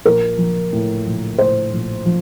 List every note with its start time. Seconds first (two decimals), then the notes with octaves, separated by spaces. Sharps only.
0.05 A#1 A#4
0.38 F3
0.72 A2
1.06 A#1
1.38 A2 C5
1.72 A#1
2.06 F3